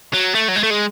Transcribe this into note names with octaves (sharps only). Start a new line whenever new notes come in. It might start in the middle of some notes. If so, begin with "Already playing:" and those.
F#3
A3
F#3
G#3
A3
G#3